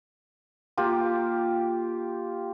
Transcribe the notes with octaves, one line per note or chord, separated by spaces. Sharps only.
A#3 F4 G4